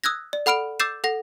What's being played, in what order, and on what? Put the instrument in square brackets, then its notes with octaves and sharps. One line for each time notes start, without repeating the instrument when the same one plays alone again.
[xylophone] D#6 E6 F#6 G#6 A#6
D5
A4 F#5 B5 F6 D7 F7
D6 E6 G6 A6 C7 E7
A4 F#5 A#6